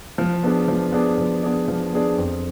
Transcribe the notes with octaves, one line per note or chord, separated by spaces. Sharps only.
F3
B3 D4 G#4 D5
F3
B3 D4 G#4 D5
F3
B3 D4 G#4 D5
F3
B3 D4 G#4 D5
F2